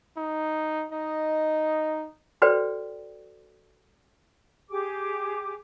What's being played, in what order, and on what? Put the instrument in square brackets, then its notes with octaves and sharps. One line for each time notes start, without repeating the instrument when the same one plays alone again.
[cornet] D#4
[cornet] D#4 [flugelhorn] D#5
[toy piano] F#4 A4 B4 C5 D5 G5
[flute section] G4 G#4 G#5 D6